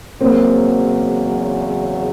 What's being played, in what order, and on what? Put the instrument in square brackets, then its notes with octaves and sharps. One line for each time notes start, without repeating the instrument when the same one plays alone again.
[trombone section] E2 C#3 F#3 [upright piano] A#3 C4